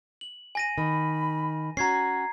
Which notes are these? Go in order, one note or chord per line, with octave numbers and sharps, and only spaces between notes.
F#7
G#5 A#6 D#7
D#3 B5
C#4 F#4 A#5 G#6 C7